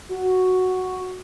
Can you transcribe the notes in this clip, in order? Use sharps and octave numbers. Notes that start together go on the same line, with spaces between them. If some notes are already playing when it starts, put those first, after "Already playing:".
F#4